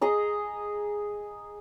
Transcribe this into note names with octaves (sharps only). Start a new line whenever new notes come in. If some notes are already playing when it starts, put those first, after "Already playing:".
G#4 D#5 A#5